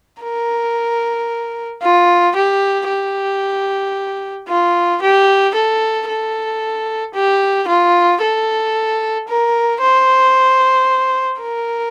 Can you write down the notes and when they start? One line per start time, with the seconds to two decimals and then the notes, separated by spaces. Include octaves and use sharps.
0.23 A#4
1.82 F4
2.35 G4
2.88 G4
4.48 F4
5.01 G4
5.55 A4
6.08 A4
7.15 G4
7.68 F4
8.21 A4
9.28 A#4
9.81 C5
11.41 A#4